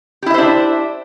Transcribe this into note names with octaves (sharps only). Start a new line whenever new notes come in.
D4 E4 G4 C5 E5